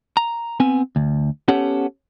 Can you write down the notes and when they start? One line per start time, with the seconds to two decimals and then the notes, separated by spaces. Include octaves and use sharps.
0.17 A#5
0.60 B3 C4 G#5
0.96 D2
1.48 B3 C#4 G4 A4 C#5 F#5